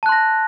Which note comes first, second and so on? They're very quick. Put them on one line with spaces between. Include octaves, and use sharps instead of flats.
A5 F#6 C6 A#6